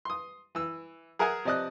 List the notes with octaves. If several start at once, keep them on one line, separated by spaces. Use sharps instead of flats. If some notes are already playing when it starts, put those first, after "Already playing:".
C6 D#6
E3 E6
G#4 A#4 E5 F#5 G#5 D#6
C3 F3 D5 D#5 D#6 F#6